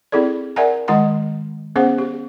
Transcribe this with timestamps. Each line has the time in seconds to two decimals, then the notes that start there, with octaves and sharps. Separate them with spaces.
0.12 C4 E4 G#4 A4 D5
0.56 A#4 D5 E5 F#5 G#5 A#5
0.88 D#3 G#3 D#5 F#5 A#5 C6
1.76 B3 C#4 G#4 C5 F#5
1.98 G4